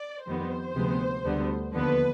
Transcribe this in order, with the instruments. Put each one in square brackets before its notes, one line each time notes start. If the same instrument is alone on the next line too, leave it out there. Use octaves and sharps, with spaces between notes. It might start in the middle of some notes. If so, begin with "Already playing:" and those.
Already playing: [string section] D5
F2 D#3 G3 B3 C5
D2 C3 F3 G#3 B3
D2 D3 G3 B3
D#2 D3 F3 B3 B4